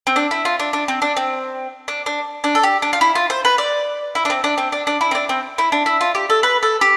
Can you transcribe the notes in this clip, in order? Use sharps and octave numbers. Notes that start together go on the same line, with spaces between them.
C4
D4
E4
F4
D4
D4
C4
D4
C4
D4
D4
D4
A4
G4
D4
F4
E4
F4
C5
B4
D5
E4
D4
C4
D4
C4
D4
D4
E4
C4
D4
C4
E4
D4
E4
F4
G4
A4
B4
A4
G4